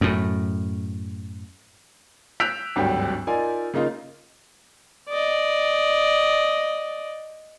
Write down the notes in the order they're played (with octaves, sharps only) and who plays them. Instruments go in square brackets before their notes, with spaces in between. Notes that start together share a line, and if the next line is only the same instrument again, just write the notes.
[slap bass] F#2 A2
[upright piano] E6 F#6 G6 B6 D7 F7
G#1 D2 G2 F#3 G3 G5
D#4 F4 A#4 D5 G#5
C#3 A#3 D#4 F4
[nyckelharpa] D5 D#5